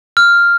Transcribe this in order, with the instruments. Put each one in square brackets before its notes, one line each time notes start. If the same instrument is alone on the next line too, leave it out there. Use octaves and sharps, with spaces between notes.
[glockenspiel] F6